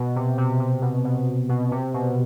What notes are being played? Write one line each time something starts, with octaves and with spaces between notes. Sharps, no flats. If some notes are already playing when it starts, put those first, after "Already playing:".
Already playing: B2
C3
C3
C3
B2
B2
B2
C3
B2